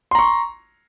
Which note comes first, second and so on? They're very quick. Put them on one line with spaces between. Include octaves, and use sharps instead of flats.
C6 A#5 C#6